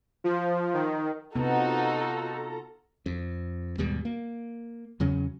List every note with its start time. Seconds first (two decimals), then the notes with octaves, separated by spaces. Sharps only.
0.24 F3
0.74 D#3
1.36 C3 B3 D#4 F4 F#4 A4 A#5
3.06 F2
3.78 D#2 G#2 B2 G3
4.05 A#3
5.00 E2 C#3 F#3 C#4